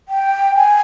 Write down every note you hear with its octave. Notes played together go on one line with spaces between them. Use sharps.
G5
G#5